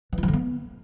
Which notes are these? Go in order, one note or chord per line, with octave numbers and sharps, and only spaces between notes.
E3
F4
F3
D3
B3